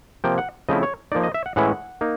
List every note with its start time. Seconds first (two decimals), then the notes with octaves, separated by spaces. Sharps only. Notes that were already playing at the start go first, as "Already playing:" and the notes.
0.24 C3 F3 A#3 G5
0.38 F#5
0.69 C#3 F3 A3 C4 E4 D#5
0.83 C#5
1.12 D#4 D5
1.15 F3 A#3
1.24 D#5
1.34 E5
1.46 F#5
1.56 A2 E3 G#3 C#4 E4 F#5
2.01 A#3 D#4